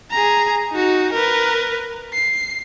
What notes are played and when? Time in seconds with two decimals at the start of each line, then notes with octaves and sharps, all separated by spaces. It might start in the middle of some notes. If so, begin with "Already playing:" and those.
0.11 G#4 A#5
0.71 D#4 F#4
1.13 A#4 B4
2.13 C7